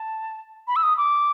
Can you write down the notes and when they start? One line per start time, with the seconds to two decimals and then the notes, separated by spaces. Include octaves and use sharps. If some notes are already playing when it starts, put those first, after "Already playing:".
Already playing: A5
0.68 B5
0.76 E6
0.83 D#6
0.98 D6